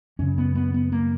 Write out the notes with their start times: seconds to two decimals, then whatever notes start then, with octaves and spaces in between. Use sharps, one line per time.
0.19 F#2 C#3 C#4
0.38 B3
0.55 B3
0.74 B3
0.92 A#3